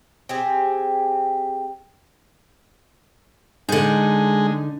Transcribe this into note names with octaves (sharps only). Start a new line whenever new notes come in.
C4 G4 G#4
D3 G#3 D#4